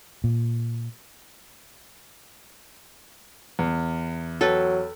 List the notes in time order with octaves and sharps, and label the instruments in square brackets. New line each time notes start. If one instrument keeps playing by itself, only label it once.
[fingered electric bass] A#2
[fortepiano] E2
[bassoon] F#3 [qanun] A4 B4 G5